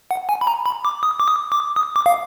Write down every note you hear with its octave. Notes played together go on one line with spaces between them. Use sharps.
F#5
G#5
B5
A#5
B5
D6
D#6
D6
D#6
D6
D#6
D6
F5